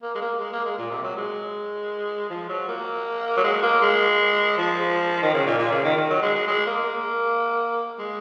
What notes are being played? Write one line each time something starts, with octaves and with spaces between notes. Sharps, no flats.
A#3
G#3
A#3
G#3
A#3
G#3
A#2
C3
F#3
G#3
F3
F#3
A#3
F#3
G#3
A#3
G#3
F3
D#3
C#3
A#2
A#2
C#3
D#3
D#3
F#3
G#3
G#3
G#3
A#3
A#3
G#3